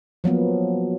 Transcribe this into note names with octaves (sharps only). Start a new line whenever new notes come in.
F3 F#3 A#3 B3